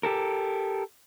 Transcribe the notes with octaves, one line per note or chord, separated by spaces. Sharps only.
G4 A4 A#4